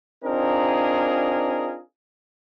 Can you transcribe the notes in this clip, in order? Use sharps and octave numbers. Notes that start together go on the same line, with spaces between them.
C4 D4 D#4 F4 G#4 A#4